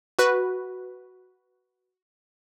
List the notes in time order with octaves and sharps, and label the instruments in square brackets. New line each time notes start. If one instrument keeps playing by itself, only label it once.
[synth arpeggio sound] F#4 B4